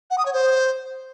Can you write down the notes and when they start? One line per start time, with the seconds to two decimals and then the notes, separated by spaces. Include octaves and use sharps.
0.11 F#5
0.18 D#6
0.26 C#5
0.33 C5